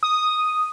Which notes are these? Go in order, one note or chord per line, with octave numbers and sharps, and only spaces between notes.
D#6